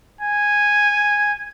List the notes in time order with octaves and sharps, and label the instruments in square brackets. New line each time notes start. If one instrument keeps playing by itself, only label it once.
[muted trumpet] G#5